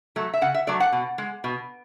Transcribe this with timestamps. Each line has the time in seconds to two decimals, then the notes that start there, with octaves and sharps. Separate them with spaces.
0.16 F#3 A3
0.34 E5
0.41 C#3 F#5
0.54 E5
0.67 F#3 A3 D5
0.80 F#5
0.92 B2
1.18 G#3
1.44 B2